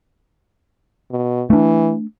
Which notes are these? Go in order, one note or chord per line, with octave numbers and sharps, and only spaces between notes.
B2
E3 A3 D4